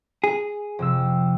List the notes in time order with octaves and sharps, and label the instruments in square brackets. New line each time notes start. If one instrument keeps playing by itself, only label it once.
[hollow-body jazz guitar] G#4
[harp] F2 C3 E6